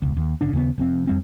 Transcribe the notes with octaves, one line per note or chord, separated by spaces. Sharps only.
E1 C#2
D#2
G1 C#3 D4
D#2 C#3 G#3 B3
F1 F2 C4
F2 G3 C4